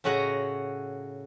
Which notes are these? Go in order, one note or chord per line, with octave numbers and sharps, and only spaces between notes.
A2 C#3 F#4 D#5 F#5 A#5